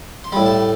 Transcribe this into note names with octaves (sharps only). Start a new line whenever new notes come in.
C6
A2 G3 B5
A5